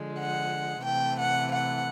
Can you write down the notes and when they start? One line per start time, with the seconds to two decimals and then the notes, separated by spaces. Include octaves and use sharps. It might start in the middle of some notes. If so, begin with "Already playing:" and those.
Already playing: D3 F3 G#3
0.18 F#5
0.84 C3 E3 A3 G5
1.18 F#5
1.51 F#5